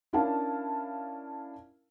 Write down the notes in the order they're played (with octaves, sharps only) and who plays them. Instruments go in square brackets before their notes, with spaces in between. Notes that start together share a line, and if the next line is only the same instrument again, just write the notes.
[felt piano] C#4 D4 E4 A#4 F5 A5